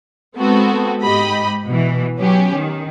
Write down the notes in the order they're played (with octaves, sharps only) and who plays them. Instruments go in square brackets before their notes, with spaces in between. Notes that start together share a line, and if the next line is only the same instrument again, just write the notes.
[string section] G#3 B3 C4 F#4 A4
G#2 G4 D#5 B5
B2 E3
F#3 B3 C#4 G4
D#3